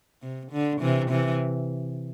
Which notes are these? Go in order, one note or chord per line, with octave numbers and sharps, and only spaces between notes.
C3
D3
C3 E3
C3 E3